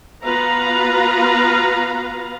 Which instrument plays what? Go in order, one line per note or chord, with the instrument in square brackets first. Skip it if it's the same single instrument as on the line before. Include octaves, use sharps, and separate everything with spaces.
[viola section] B3 F4 F#4 B4 F5 A#5